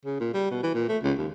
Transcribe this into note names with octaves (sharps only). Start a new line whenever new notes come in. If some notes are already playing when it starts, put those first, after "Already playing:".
C#3
A#2
G3
B2
E3
A#2
A3
C#2
D#2